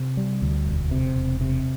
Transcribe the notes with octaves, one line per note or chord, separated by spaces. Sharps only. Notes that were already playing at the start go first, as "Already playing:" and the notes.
Already playing: C3
G3
D2
E1
C3
E1
C3